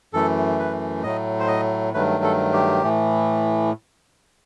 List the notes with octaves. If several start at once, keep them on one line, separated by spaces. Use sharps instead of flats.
F#2 E3 A3 A4
B4
A2 F#3 A3 D#5
C5
D#5
G2 D#3 F#3 A3 B4
A4
G4
A2 E3 A3